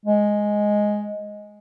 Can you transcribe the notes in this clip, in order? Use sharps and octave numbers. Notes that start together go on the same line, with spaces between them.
G#3